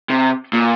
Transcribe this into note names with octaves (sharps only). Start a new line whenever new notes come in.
C3
A#2